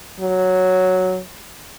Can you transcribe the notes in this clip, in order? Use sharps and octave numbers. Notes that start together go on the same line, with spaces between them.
F#3